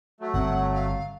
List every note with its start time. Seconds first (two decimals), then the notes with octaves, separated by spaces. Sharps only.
0.20 F#3 A3
0.34 G1 C4 F#5
0.74 F5